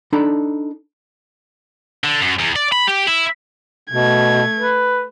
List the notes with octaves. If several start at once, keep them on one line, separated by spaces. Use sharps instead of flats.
D4 D#4 A4 A#5 B5
D3
F#2
E2
D5
B5
G4
E4
B2 A3 G#6
B4